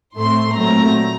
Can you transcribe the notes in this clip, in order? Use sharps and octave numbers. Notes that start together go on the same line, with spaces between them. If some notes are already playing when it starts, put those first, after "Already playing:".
A2 A3 C4 C6
A#2 F#3 A3 C4 A#5